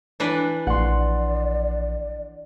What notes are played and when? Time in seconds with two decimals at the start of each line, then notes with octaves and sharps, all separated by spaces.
0.20 E3 D4 B4
0.67 A#1 D5 F#5 C6